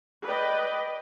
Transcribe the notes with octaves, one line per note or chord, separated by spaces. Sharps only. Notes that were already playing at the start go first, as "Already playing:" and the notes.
B4 D5 D#5 G5